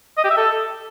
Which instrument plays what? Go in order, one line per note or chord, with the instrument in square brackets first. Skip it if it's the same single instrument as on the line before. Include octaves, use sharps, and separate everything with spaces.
[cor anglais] D#5
G4
E5
A4